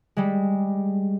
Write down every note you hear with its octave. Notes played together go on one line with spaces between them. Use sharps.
G3 G#3